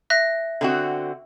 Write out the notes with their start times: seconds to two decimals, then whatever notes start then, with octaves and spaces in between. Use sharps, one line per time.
0.10 E5 F#6 A#6
0.61 D3 C4 F#4